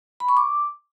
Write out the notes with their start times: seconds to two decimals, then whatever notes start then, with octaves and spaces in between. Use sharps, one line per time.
0.20 B5
0.29 C#6
0.37 D6